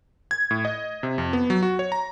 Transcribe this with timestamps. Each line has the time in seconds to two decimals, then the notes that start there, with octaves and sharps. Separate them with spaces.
0.31 G#6
0.51 A2
0.65 D#5
1.03 C3
1.18 F2
1.33 B3
1.50 F#3
1.63 F#4
1.79 C#5
1.92 A#5